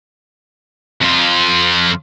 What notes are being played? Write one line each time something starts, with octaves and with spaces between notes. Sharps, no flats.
F2 F4